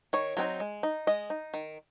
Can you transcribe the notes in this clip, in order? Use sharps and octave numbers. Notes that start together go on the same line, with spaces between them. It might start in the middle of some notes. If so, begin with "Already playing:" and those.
D#3 C#5
F#3 C4 D#4
G#3
D#4
G#3 D#5
D#4
D#3